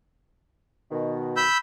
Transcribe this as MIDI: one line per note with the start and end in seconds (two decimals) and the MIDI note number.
0.91 1.44 47
0.91 1.44 51
1.37 1.58 83
1.37 1.58 88
1.37 1.58 91